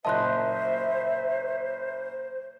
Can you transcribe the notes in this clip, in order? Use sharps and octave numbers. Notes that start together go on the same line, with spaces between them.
F#1 A#2 C5 D#5 E5 A5 C6 F#6